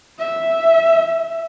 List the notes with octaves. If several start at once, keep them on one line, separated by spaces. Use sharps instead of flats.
E5